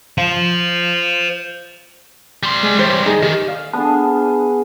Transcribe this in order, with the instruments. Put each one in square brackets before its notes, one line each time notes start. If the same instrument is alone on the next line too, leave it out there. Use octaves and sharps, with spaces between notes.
[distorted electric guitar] C5 F5
G3 C6
[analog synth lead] G#3
[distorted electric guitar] E3 G3 [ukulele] A#4 C5 C#5 [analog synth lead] C6
[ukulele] D#4 G#4 [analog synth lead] D#5
[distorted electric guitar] D#3 [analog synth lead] G4
[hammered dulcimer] F5
[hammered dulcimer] B3 G#4 [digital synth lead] D4